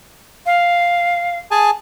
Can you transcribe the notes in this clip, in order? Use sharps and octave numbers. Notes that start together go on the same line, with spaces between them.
F5
G#4 G#5 A5